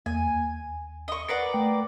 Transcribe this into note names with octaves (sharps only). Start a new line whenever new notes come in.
E2 A#3 G#5
D#2
D#5 C#6
A#4 B4 D5 F#5 C7 C#7
A3 G5